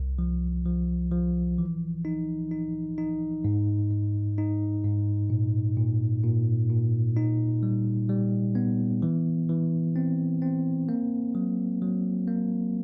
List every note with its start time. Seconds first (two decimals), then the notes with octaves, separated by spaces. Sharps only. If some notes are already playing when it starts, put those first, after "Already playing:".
Already playing: C2
0.19 F3
0.66 F3
1.11 F3
1.58 E3
2.05 D#4
2.51 D#4
2.98 D#4
3.45 G#2
3.91 G#2
4.38 D#4
4.84 G#2
5.30 A#2
5.77 A#2
6.23 A#2
6.70 A#2
7.17 D#4
7.63 G3
8.09 G3
8.55 B3
9.02 E3
9.49 E3
9.96 C4
10.42 C4
10.89 A#3
11.35 F#3
11.82 F#3
12.28 A#3